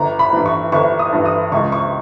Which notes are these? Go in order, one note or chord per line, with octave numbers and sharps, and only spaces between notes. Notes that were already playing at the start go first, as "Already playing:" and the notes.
Already playing: G1 A#5
B5
G2 E3
C#6
G1 C#6
D#6
G2 E3
D#6
C#2 C#6
C#6